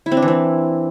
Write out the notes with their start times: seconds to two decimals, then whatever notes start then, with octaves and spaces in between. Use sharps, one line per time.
0.06 E4
0.12 C4
0.17 D4
0.22 E3
0.28 C4